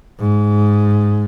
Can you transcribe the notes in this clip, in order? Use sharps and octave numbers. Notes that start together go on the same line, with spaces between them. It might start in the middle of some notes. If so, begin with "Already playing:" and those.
G#2